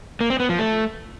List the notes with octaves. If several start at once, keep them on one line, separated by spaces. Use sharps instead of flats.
A#3
C4
B3
F3
A3